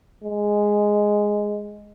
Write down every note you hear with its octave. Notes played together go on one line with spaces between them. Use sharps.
G#3